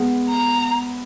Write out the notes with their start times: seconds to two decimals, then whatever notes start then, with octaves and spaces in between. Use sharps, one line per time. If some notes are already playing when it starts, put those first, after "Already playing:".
Already playing: G#3 B3
0.29 A#5